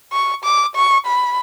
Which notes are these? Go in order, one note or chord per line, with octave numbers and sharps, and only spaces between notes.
C#6
D6
C#6
B5